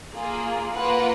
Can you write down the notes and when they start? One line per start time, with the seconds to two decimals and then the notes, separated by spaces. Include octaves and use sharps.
0.14 A#3 F4 G#4
0.72 A#3 F4 B4 F#5